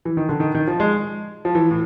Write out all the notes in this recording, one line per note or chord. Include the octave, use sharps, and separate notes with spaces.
E3
D#3
D3
D#3
D#3
F3
G#3
F3
E3
A2